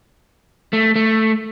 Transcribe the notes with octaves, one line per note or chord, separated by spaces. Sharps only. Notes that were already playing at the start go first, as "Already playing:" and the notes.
A3
A3